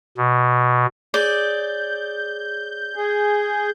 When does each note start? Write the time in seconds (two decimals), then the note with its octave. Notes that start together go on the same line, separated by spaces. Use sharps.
0.17 B2
1.14 G#4 C#5 D5 G6
2.96 G#4